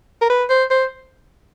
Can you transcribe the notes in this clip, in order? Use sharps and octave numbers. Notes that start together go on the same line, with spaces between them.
A#4
B4
C5
C5